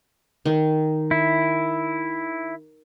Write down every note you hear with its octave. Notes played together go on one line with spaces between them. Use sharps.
D#3
E4